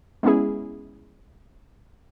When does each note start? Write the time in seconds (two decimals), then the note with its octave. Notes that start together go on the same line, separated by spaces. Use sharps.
0.23 G#3 B3 C#4 E4 G#4